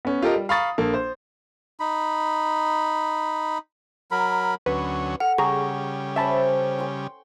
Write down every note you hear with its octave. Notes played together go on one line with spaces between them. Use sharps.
B3 C#4
F4 G4 A4 A#4 D#5
G3
F5 A#5 B5 C#6 D#6 A6
A#1 A#3 A4
C5
D#4 B5
F#3 A#4 B5
D2 F#3 C#4 B4
A4 F#5 F6
C#3 G3 G#4 A#5 C#6
C#4 C5 E5 A5 B5
G5 C6 C#6